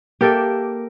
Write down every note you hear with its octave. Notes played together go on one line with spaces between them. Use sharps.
A#3 G4 A4 A#4 E5